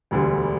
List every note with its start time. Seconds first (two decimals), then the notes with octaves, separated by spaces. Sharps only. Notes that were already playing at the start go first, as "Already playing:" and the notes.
0.11 E1 D2 D3 G3